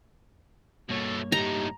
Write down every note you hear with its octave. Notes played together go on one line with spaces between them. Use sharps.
G2 B2 A3 A#3 C#5
A2 D#4 G4 A#5